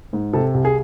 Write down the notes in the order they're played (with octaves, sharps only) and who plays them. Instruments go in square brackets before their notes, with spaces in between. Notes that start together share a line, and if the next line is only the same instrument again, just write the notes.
[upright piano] G#2
C3 A4
C2
G#4